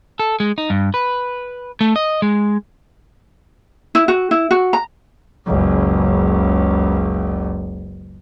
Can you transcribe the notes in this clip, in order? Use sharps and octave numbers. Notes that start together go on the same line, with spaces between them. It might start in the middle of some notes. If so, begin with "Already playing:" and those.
A4
G#3
D#4
G2
B4
A3
D#5
G#3
E4
F#4
E4
F#4
A#5
F#1 C#2